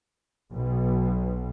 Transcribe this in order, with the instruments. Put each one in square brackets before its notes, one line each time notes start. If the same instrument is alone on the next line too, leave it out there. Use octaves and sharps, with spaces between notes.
[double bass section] B1 B2